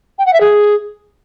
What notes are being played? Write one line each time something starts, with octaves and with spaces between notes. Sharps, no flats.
G5
F#5
E5
G#4